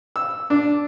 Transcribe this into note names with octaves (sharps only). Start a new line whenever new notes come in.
E6
D4